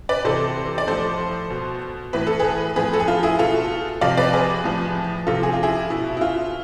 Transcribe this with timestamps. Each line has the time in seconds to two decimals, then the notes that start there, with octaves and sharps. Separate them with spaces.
0.09 B4 D5
0.25 C3 E3 A4 C5
0.78 D5
0.87 A2 F3 A4 C5
1.50 B2
2.13 A2 E3 B4
2.27 A4
2.39 G#4 B4
2.76 A2 F3 G#4 B4
2.93 A4
3.00 G#4
3.08 F4
3.23 E4 G#4
3.39 B2 F4 A4
4.01 C3 F3 D5 F5
4.17 B4 D5
4.33 G#4 B4
4.64 A2 F3
5.27 C3 F3 F4 A4
5.43 G#4
5.53 F4
5.63 E4 G#4
5.90 B2 E4
6.17 E4
6.21 F4